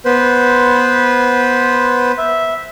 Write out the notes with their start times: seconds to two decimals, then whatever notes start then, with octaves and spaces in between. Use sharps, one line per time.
0.05 B3 B4 C5
2.18 E5